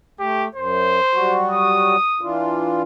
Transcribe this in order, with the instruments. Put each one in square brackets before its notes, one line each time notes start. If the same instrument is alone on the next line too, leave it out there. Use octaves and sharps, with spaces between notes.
[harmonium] A3 [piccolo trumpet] G4
[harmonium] F#2 [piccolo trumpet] C5
[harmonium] F#3 G3 F#4
[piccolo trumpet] D#6
[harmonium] E3 D4 F4